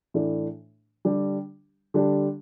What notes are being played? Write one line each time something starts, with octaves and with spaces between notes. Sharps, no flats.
A2 E3 A3 D4
D3 G3 D4 G4
D3 G3 D4 G4